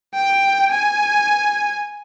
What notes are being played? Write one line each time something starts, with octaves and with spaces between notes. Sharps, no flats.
G5
G#5